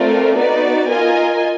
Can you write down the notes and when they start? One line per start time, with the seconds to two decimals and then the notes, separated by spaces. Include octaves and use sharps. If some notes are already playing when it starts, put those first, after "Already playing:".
Already playing: A3 C4 F4 A#4 D5
0.36 B3 D#4 F#4 B4 D5
0.90 F4 A#4 D#5 G#5